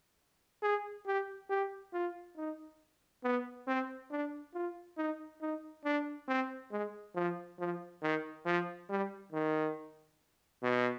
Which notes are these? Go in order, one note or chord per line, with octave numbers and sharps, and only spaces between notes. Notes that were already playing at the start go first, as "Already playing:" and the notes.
G#4
G4
G4
F4
D#4
B3
C4
D4
F4
D#4
D#4
D4
C4
G#3
F3
F3
D#3
F3
G3
D#3
B2